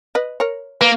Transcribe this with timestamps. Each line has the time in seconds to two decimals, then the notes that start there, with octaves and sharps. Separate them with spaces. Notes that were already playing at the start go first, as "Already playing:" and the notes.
0.15 B4 D#5
0.40 A#4 C#5
0.81 A#3 B4